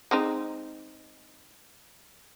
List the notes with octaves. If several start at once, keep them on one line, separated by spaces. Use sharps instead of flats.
G#3 C4 D#4